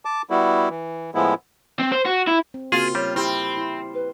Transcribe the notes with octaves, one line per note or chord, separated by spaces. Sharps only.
A5 D6
G3 B3 E4 F#4
E3
A2 F3 G#3 B3 E4
C4
C5
F#4
E4
C4
C#3 A#3 C4 F4 F#4 G#4
G3 C#5
C4 E4 G4 B5
E4
B4